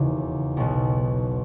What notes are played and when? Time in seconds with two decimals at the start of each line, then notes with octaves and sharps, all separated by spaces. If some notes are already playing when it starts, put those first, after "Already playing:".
Already playing: E1 D#2 C#3 E3
0.57 B1 B2